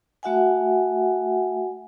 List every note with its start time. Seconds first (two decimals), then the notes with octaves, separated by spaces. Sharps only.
0.23 A3 F#4 E5 F#5 G#5